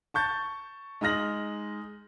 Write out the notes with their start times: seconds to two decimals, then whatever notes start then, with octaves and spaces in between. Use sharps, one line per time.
0.14 A5 C#6 G6 A6
1.01 G#3 D#4 D#6 F6 A#6 F#7